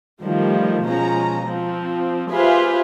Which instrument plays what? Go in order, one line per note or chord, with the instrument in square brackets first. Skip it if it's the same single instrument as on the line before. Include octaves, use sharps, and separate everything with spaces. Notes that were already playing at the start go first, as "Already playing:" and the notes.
[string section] D#3 F3 G3 A3
B2 F3 G#3 C#4 A#5
F3 C4
F4 G4 G#4 B4 C5 E5